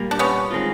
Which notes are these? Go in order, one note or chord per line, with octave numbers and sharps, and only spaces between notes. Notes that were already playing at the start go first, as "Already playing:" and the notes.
Already playing: A#2 G3 A#3
D4
B3 C#4
D#3 G#3 C4 F4